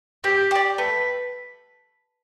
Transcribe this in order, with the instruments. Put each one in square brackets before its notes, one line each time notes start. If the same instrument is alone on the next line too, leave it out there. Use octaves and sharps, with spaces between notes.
[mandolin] C4 [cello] G4
[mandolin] G4 D5
[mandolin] A3 [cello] B4